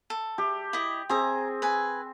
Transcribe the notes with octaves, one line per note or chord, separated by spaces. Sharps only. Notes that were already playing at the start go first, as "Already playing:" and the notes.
A4
G4
E4 D#5
C4 G#4 G#5 A#5
B4 G#5